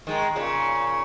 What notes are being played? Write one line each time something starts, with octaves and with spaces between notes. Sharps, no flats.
D#3 G#3
A#2 C#3